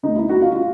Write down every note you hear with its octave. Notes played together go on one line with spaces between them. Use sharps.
D2 D3 D#4
E4
F#4
F4
F4